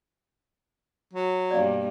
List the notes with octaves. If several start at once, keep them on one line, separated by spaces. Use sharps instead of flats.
F#3
G2 B2 A#3 D5 F5